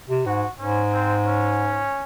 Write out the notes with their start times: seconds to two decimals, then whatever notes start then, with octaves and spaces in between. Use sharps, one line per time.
0.08 C3
0.26 G#2 F#4
0.58 G#2 C#4
0.92 C4
1.26 C#4